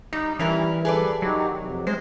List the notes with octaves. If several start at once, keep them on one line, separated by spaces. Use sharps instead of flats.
G3 D#4
E3 G3 C#4 E4 A#4
G3 G#4 A4 B4 D5
D#3 F#3 D#4 G4
F2 C3
G#3 C5